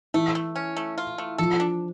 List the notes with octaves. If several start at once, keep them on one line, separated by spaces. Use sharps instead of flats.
E3 A3
A3
C#4
A3
F4
A3
F3 A4
D4